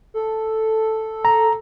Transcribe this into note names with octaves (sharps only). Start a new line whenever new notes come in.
A4
A#5